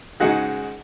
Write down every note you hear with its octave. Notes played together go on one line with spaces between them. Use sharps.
G#2 C#3 D#4 F#4 G#4